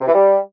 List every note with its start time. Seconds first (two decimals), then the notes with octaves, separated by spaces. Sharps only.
0.01 C3
0.08 E3
0.14 G3